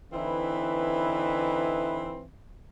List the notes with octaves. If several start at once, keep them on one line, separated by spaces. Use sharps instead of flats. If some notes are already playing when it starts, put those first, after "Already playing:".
D3 E3 C4 D#4 E4 B4